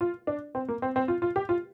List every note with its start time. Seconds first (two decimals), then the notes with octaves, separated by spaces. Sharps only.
0.01 F4
0.27 D4
0.55 C4
0.68 A#3
0.82 C4
0.96 C4
1.08 F4
1.22 F4
1.36 G4
1.49 F4